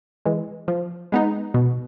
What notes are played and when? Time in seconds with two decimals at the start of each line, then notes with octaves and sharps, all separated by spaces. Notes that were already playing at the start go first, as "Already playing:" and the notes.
0.25 E3 G#3
0.68 F3
1.12 G#3 B3 D#4
1.54 B2